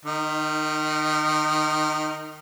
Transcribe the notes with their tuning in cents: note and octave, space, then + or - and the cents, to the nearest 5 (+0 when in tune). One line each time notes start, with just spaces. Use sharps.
D#3 -25 D#4 +0